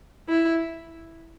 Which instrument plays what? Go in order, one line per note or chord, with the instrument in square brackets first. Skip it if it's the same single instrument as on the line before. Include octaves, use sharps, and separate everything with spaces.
[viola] E4